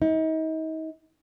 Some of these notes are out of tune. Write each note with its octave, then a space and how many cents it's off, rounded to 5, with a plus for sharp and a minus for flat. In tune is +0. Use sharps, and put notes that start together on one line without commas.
D#4 +35